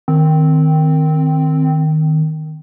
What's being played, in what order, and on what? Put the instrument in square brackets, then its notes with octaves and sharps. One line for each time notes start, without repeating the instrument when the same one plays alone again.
[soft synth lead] D#3 [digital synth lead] C4